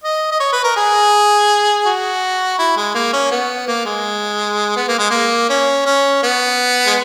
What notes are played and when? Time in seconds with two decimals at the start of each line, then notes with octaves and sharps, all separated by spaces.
0.03 D#5
0.31 D#5
0.40 C#5
0.52 B4
0.64 A#4
0.76 G#4
1.85 F#4
2.58 E4
2.76 G#3
2.94 A#3
3.13 C#4
3.31 B3
3.67 A#3
3.85 G#3
4.76 B3
4.88 A#3
4.99 G#3
5.10 A#3
5.49 C#4
5.86 C#4
6.23 B3
6.86 G#3